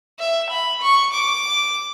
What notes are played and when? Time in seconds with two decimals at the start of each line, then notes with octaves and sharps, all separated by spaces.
0.19 E5
0.51 B5
0.82 C#6
1.13 D6